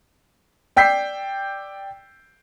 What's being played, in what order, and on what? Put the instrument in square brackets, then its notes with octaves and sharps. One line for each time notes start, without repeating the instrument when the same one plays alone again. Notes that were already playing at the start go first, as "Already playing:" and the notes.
[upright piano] D5 G5 E6 G6 B6 C7